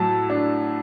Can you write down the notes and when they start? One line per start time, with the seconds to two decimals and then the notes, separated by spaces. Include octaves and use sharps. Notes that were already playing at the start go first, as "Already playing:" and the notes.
Already playing: A2 F#3 A5
0.30 D4